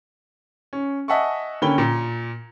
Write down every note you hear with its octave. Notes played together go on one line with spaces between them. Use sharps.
C#4
D#5 E5 F#5 G#5 A5 C#6
D3 A#3 C#4 G5 B5 G7
A#2